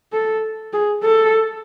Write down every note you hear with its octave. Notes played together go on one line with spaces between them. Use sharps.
A4
G#4
A4